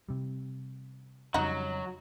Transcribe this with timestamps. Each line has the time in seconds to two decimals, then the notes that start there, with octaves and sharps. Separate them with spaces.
0.09 C3 G3
1.34 F2 C#3 F#3 G3 D#4 F#4